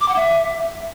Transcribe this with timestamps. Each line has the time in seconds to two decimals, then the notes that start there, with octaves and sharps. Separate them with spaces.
0.01 D6
0.08 F#5
0.16 E5